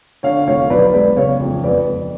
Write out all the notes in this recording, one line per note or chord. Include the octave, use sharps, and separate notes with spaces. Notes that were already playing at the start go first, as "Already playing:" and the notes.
D3 C#5 F5
F1 C#5 F5
B1 B4 D5
G#3 B4 D5
C#3 C#5 F5
F2
F2 B4 D5
F2